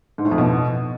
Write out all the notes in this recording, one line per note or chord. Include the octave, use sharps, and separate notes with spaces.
G#2
A2
F2
B2